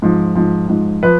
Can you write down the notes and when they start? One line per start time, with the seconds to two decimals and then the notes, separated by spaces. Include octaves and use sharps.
0.02 G#2 F3
0.35 G#2 F3
0.68 G#2 F3
1.03 F3 B4